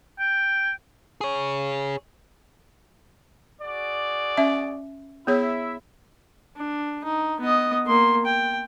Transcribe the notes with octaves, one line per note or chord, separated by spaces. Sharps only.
G5
G#4 C#5
F#4 G#4 D5
C#4 E5
B3 E4 G#4 C#5 E5
D4
D#4
B3 D#5
A#3 C6
G5